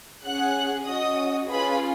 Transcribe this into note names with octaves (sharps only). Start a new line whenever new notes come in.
C#4 G#4 F#5 F#6
C#4 F#4 D#5 D#6
C#4 F4 G#4 B4 B5